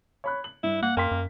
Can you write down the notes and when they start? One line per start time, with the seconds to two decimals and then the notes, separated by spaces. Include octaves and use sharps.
0.24 C#5 B5 F#6
0.44 F#7
0.63 G2 E4
0.82 A#3 F#5
0.97 F#2 A#3 G5 C6 B6
1.11 F#2